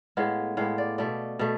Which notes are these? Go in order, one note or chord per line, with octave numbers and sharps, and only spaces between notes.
A2 G#3 B3 F5
A2 G#3 B3 F5
D5
B2 A3 D5
B2 A3